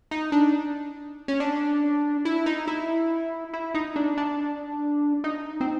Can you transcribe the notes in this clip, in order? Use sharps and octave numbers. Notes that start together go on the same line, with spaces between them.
D#4
D4
C#4
D4
E4
D#4
E4
E4
D#4
D4
D4
D#4
C4